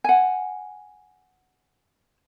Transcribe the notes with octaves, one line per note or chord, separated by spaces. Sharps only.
F#5 G#5